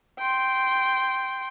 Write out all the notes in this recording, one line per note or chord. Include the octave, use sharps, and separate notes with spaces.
G5 C6